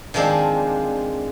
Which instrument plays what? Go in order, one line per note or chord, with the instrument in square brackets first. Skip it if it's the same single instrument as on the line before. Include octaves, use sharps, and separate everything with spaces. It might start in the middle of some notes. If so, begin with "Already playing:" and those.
[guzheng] D#3 F3 G#3 C4 D4